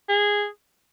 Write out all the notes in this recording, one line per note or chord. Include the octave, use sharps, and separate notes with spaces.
G#4